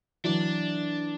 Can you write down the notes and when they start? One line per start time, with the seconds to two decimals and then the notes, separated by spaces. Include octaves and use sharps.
0.24 E3 F#3 D4